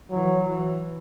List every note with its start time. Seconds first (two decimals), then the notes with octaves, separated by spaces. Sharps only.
0.11 E3 F#3
0.49 E3